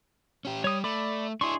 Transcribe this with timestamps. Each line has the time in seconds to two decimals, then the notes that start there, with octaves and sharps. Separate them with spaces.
0.45 C#4 G4
0.64 G3 C#5 D#6
0.84 A3 D5 B5 D6
1.41 D4 E4 G#4 C6 C#6